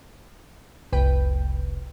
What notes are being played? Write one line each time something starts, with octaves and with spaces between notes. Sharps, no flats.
F1 C2 B4 G5